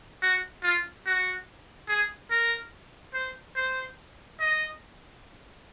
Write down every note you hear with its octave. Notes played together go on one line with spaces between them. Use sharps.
F#4
F4
F#4
G#4
A#4
C5
C5
D#5